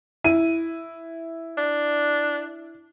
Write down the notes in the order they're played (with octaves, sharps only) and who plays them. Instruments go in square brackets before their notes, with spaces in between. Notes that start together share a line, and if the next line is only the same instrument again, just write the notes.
[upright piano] E4 D#7
[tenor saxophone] D4